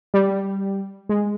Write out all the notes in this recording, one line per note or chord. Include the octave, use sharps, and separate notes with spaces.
G3
G#3